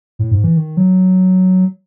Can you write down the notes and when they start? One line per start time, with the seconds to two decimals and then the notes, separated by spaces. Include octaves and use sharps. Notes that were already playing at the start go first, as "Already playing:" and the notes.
0.19 A2
0.31 G#2
0.44 E3
0.57 D#3
0.77 F#3